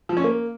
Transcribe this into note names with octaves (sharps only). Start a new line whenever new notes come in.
F3
C#4
A#3